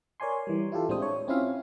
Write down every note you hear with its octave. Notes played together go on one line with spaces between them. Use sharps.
A#4 C#5 D5 G#5 C6
E3 G3
E4 F4 G4 A4
A2 G#3 C4 D4 C5 D#6
C#5
C4 C#4 E4 F4 E5 F5